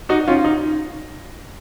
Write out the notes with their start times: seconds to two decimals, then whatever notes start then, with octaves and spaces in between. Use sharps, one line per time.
0.09 D#4 F#4
0.28 C#4 F4
0.44 D#4